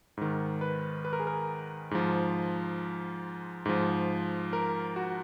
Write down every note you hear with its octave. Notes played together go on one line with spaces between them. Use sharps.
G#2 D#3
B4
B4
A#4
G#4
A#4
G#2 F3
G#2 F3
A#4
F#4